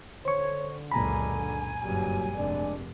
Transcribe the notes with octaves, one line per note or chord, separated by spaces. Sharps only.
D3 C5 C#5 C#6
C#2 F#2 A#2 G#5 A#5 B5
F#1 G2 F#3 G3
F1 G#3 D4 D5